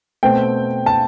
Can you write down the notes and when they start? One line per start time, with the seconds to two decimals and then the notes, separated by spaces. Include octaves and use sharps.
0.23 B2 A3 C4 G5
0.86 A5